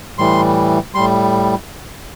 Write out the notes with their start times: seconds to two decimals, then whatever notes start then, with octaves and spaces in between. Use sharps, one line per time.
0.18 A2 E3 G3 C6
0.94 A2 G3 C6